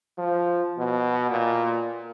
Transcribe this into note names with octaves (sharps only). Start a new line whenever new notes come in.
F3
B2
A#2